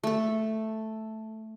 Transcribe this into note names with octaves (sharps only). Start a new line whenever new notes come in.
A3 A4